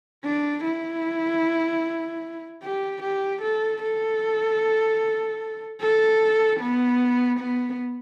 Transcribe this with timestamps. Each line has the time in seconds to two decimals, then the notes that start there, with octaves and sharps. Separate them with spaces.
0.24 D4
0.64 E4
2.63 G4
3.03 G4
3.42 A4
3.83 A4
5.81 A4
6.61 B3
7.39 B3